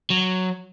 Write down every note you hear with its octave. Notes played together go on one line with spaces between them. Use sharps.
F#3